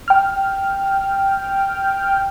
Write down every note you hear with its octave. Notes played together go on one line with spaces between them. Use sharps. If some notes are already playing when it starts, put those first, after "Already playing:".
G5 F6